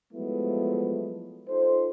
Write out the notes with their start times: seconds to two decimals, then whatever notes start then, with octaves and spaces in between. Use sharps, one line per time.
0.13 F3 F#3 G#3 A3 B3 E4
1.49 D#4 F4 A4 C5